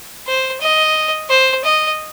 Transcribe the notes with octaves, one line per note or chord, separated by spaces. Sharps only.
C5
D#5
C5
D#5